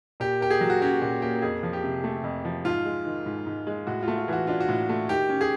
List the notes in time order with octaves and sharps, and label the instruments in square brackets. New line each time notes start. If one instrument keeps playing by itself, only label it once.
[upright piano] A#2 [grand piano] G4
[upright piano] A#3 [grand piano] G4
[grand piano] G#4
[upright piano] F#3
[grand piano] F#4
[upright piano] C#4 [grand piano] G4
[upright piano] A#2 [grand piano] F#4
[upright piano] A#3 [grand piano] G4
[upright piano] F2 [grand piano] G#4
[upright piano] F3
[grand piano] G4
[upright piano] C3
A3
F2
F3
[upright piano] G#2 [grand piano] F4
[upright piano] G#3
D#3
G#2
G#2
G#3
[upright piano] A2 [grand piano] F#4
[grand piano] F4
[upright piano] A3
[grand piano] F4
[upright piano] E3 [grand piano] F#4
[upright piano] D4 [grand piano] F4
[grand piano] F#4
[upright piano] A2
A3
[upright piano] D#3 [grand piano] G4
[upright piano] C#4
[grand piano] G#4